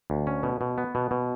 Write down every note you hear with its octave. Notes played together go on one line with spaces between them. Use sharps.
D2
C#4
B2
B2
B3
B2
B2